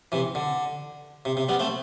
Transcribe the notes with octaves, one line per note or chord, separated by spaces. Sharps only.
C3 E3
D3
C3
C3
G3 B3
A3 C4